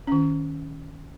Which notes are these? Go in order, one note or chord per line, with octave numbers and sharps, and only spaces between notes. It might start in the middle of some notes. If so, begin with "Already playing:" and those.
D#3 C#4